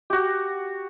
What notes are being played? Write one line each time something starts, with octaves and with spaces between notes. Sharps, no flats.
F#4 G4